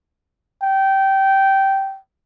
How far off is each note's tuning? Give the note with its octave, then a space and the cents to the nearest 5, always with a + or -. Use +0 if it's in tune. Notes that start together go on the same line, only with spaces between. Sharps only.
G5 -15